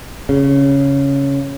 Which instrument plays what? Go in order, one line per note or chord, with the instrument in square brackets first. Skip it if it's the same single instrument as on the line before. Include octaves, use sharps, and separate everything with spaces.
[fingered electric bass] C#3